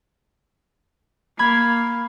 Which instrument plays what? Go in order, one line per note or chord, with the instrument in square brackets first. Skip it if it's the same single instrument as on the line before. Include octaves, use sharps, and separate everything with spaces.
[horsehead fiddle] A#3 [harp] B5 G#6